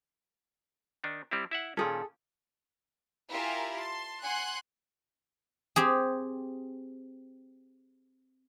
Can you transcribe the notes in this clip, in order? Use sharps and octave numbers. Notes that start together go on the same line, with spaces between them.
D#3 D4 D#4
G3 C4 E4
E4 E5 F#5
A#2 D#3 C#4 G#4 A4
E4 F4 G4 A#4 G#5 A#5
A5 C6
F#5 G#5 C6 F#6
C4 G4 G#4